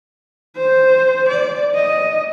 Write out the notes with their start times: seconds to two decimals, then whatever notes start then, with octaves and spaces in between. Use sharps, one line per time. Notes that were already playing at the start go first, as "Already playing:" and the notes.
0.57 C5
1.29 D5
1.75 D#5